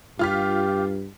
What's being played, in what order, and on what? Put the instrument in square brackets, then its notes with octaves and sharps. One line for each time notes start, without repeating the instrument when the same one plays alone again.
[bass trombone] G2 [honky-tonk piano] F4 F6 B6 [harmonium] G4